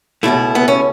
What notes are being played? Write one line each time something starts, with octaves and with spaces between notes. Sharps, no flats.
C#2 B2 A3 E4
B3
C#4